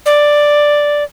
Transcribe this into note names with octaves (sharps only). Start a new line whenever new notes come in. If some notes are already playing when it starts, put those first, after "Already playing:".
D5